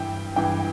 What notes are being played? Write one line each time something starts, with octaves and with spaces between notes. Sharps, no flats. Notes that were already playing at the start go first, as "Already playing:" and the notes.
Already playing: G2 E3 E5 G5
G2 E3 G5